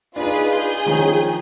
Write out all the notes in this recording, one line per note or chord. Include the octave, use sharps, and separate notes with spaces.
D4 D#4 F4 G#4 B4
G#4 G6
D#3 F3 C#4